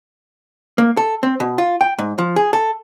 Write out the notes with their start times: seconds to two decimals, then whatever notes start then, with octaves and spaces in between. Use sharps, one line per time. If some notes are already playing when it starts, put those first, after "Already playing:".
0.78 A#3
0.97 A4
1.23 C4
1.40 B2
1.58 F4
1.81 G5
1.98 G#2
2.18 F3
2.36 G#4
2.53 A4